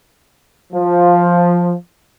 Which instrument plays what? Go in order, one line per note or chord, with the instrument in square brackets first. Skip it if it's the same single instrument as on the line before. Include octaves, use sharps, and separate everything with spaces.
[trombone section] F3